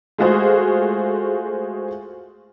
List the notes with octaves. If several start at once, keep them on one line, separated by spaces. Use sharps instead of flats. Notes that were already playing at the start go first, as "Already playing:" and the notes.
G#3 A3 F4 F#4 G#4 C5